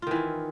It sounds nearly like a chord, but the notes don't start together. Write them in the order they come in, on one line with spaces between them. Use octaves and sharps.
F4 D#3 E3 E4